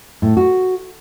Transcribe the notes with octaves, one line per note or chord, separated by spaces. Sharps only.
A2
F#4